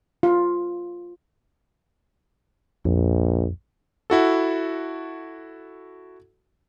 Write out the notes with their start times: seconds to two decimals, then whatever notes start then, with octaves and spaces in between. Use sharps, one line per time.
0.23 F4
2.85 A#1 F2
4.10 E4 F#4 A4